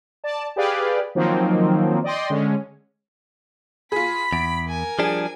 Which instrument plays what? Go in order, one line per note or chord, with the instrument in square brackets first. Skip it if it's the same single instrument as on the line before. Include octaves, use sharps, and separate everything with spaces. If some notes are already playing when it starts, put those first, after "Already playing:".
[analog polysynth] D5 A5
G4 G#4 B4 D5 F5
D#3 F3 F#3 A#3 C4 D#4
D5 D#5 G5 C6
D3 G#3 C#4
[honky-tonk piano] F4 G#4 [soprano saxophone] B5 [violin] B6
[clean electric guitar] E2 [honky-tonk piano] D7
[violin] A#4 G#5
[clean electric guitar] F3 G3 D4 [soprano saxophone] G#4